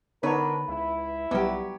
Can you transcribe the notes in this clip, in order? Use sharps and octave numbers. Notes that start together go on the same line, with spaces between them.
D3 B3 D4 D#4 A#4 B4 C#5
C#2 E4
B1 F#3 G3 B3 G4